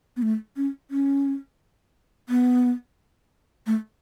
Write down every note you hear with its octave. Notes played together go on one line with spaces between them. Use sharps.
B3
A3
C#4
C#4
B3
A3